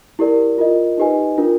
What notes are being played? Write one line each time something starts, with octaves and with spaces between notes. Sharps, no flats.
E4 G4 A#4 D5
F4 A#4 D#5
D#4 G4 B4 D#5 G#5
D4 F4 A#4